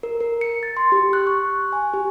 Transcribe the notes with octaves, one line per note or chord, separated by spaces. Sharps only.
A#4
A#4
C#7
A6
C6
G4
F#6
C#6
G#5
G4